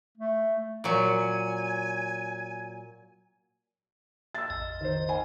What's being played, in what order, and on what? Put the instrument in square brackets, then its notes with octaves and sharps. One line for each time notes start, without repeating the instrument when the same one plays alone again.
[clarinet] A3
[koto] A#2 F#3 [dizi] G#5
[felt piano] E6 A6
[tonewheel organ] A#1 F2 D#5
[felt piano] D#3 C5
G#5